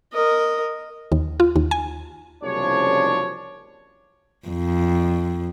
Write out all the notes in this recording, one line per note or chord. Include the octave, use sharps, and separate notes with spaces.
A#4 D#5
D#2
F4
D#2
G#5
F#1 C2 C#3 F3 D4 C#5
F2